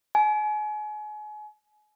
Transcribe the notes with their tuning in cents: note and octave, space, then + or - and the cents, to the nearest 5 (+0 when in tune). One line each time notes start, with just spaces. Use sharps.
G#5 +35